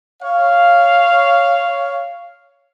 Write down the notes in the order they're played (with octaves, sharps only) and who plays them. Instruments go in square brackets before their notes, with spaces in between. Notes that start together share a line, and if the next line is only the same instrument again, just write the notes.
[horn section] C#5 F5